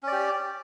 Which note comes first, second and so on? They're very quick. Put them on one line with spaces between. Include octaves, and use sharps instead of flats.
C#4 D5 G4